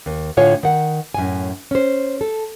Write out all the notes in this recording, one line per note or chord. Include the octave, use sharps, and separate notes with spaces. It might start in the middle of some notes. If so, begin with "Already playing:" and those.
D#2
A2 D3 F4 C#5 G#5
D#3 F#5
F#2 A2 G#5
C#4 C5
A4